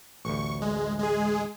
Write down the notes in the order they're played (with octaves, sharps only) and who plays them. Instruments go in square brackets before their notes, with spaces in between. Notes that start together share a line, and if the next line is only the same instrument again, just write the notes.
[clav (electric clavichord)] A1 D2 [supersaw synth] C#6
[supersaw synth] G#3
G#3 G#4